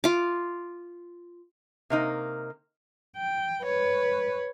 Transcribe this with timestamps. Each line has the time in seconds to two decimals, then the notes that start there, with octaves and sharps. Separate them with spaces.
0.04 F4 D6
1.90 C3 A#3 D#4
3.17 G5
3.63 B4 C#5